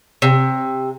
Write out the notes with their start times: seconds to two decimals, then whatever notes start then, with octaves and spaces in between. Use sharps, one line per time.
0.22 C3